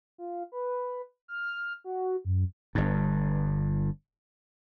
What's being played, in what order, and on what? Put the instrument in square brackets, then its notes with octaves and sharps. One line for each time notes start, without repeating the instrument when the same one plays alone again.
[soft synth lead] F4
B4
F6
F#4
F#2
[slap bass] G1 G2